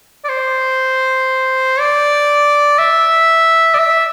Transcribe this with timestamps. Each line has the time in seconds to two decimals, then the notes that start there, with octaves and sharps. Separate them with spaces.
0.24 D5
0.29 C5
1.80 D5
2.78 E5
3.74 D5
3.79 E5